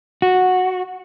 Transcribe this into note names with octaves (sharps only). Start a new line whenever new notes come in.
F#4